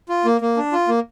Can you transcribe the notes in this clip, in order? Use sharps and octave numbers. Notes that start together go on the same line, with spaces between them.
F4
A#3
A#3
D4
F4
A#3